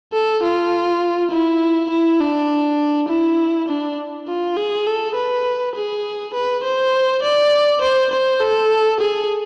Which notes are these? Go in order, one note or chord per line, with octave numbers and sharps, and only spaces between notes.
A4
F4
E4
E4
D4
E4
D4
F4
G#4
A4
B4
G#4
B4
C5
D5
C5
C5
A4
G#4